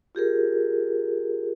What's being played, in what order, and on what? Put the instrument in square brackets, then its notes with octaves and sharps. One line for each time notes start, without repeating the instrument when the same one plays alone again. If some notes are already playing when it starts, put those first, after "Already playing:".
[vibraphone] F4 G4 G#4 A#4